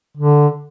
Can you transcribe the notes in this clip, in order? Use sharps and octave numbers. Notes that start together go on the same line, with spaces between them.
D3